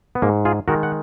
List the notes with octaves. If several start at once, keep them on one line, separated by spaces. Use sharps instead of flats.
B3
G#2 A#3
F4 G#4
D#3 G#3 F#4 A#4
F#5